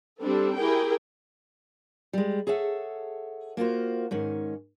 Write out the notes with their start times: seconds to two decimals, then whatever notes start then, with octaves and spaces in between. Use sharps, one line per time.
0.22 G3 C4 D4 A4
0.58 E4 G4 G#4 A#4 G5
2.13 G3 G#3
2.47 G#4 A4 C#5 E5 F#5
3.57 A#3 F4 F#4 C5
4.11 G#2 D#3 C#4